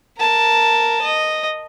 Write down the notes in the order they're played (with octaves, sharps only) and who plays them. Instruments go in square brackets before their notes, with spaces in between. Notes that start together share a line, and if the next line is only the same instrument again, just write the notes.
[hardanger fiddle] A#4 A5
D#5